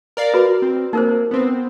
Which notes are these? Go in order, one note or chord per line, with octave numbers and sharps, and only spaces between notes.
A#4 D5 F5
F#4 B4
C4
A#3 D#4 A#4 C5
B3 C4